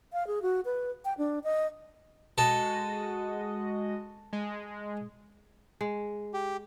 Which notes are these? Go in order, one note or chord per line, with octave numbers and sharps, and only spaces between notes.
F5
G#4
F#4
B4
G5
D4
D#5
G#3 F#4 A4 D#5
G#3
G#3
G4